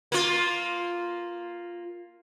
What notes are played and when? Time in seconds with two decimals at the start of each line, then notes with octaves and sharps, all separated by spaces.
0.12 A#3 F4